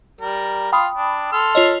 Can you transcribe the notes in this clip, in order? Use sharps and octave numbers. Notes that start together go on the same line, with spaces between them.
G3 A#4
F4 G5 B5 D#6
D4
A4 C6 F6
F4 C#5 D#5